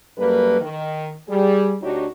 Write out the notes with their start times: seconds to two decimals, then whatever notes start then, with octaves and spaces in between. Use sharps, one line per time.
0.18 F#2 G3 A#3 A4 B4
0.61 D#3
1.29 G3 G#4
1.82 D2 D4 D#4 F#4 G4 C#5